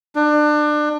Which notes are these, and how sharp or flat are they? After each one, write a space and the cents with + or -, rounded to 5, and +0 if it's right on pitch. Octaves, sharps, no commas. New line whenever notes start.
D4 +25